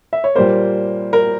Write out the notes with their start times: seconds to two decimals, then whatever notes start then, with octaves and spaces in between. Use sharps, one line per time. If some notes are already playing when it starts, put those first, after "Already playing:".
0.13 E5
0.24 C#5
0.35 A#2 G3 A#3 C5
1.13 A#4